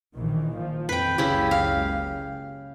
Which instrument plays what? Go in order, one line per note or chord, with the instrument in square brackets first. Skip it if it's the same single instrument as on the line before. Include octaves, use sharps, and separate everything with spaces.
[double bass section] A#1 D#3 E3
F3
[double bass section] F2 [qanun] B4 G5
[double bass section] F#1 C#2 [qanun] C#3 E4 G4
[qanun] F5